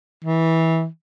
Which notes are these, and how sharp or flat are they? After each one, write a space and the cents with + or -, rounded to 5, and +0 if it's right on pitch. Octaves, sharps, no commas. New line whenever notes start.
E3 -20